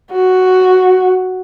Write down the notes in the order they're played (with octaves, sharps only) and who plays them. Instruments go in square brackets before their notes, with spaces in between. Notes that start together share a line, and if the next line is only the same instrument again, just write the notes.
[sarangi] F#4